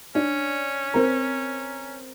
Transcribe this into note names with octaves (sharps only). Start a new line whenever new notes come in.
C#4 D4
C4 A#4